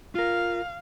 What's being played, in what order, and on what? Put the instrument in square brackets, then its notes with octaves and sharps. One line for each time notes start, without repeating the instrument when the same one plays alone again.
[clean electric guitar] F4 A#4 [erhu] F5